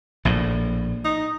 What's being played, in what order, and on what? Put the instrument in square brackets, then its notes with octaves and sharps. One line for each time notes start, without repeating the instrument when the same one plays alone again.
[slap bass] A#1 A2
[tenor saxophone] D#4